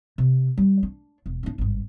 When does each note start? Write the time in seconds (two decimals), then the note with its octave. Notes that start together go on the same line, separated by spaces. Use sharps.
0.18 C3
0.58 G3
0.83 D4
1.26 E1
1.43 C#4 D4
1.58 G#1 G2